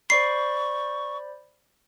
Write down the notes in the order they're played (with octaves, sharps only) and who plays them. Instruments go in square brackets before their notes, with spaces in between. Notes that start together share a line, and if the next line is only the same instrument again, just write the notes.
[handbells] C5 D5 B5 [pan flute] C#6 [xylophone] C7